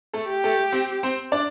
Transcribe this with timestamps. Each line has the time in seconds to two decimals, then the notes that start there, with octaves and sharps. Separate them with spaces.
0.13 A3 A4
0.29 G4
0.44 A3 A4
0.72 C4 C5
1.03 C4 C5
1.32 D4 D5